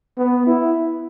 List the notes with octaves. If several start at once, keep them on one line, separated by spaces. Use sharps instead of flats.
B3
E4